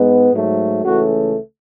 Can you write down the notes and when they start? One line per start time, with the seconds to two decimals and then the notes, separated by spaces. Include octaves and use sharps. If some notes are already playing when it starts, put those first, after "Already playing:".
Already playing: G#2 G#3 B3
0.32 G#2 F#3 A3
0.85 C#2 C#3 E3 A3 F#4